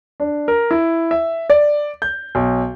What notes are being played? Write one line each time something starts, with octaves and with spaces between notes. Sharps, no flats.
D4
A#4
E4
E5
D5
G6
B1